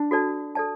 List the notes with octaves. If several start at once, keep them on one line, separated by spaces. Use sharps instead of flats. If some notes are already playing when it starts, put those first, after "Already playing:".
Already playing: D4
F#4 A4 D5 A5
A4 D5 A5